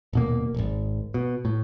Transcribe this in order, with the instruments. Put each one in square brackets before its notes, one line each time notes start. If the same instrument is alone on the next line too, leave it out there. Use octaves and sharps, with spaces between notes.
[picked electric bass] D#1 B2 A#3
D#1 G#1
B2
A2